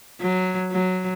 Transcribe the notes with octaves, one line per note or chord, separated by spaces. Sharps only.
F#3
F#3